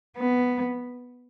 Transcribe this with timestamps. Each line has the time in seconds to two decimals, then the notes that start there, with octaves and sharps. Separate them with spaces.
0.18 B3